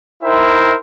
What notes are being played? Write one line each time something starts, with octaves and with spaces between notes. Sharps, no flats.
D#4 E4 A#4 C5 E5 G5